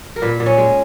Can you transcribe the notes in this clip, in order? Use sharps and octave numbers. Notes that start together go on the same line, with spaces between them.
A#4
A#2 B4
A#2
C#4
G#3